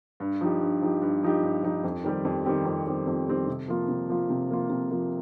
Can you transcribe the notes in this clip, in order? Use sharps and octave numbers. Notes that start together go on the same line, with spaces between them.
G2
F3 D#4 G4
G2
F3 D#4 G4
G2
F3 D#4 G4
G2
F3 D#4 G4
F2
D#3 G3 C4 G4
F2
D#3 G3 C4 G4
F2
D#3 G3 C4 G4
F2
D#3 G3 C4 G4
C3
F3 A#3 F4
C3
F3 A#3 F4
C3
F3 A#3 F4
C3
F3 A#3 F4